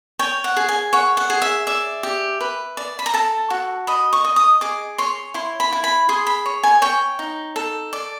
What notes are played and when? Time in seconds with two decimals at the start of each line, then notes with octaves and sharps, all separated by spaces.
0.19 C#5 G5
0.44 F#5
0.57 G#4
0.69 G#5
0.93 C#5 F#5
1.17 F#5
1.30 G#4
1.42 E5
1.67 D5 E5
2.03 G4
2.41 B4
2.77 D5
2.99 B5
3.06 A#5
3.14 A4 A5
3.50 F#4
3.87 D#5 B5
4.13 C#6
4.24 D#5
4.36 D#6
4.61 G#4 D6
4.98 C#5 C6
5.34 E4 C6
5.60 B5
5.72 E4
5.84 B5
6.09 G#4 C6
6.27 B5
6.46 C#5
6.63 G#5
6.82 C#5 G5
7.19 D#4
7.56 A4
7.93 D5